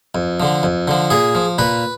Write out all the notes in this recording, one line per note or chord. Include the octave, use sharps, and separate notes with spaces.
F2
D3 F3
F2
D3 F3
A#2 G#4
F3
A#2 B4